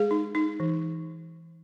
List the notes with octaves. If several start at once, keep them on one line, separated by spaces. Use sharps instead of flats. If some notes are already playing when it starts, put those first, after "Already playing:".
Already playing: G#3 G#4
D#4
D#4
E3